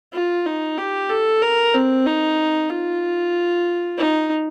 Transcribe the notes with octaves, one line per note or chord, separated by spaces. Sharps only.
F4
D#4
G4
A4
A#4
C4
D#4
F4
D#4